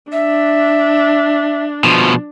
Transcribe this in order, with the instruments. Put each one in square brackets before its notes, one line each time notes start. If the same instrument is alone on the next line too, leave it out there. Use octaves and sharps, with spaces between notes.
[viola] D4 [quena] E5
[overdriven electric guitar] B2 F3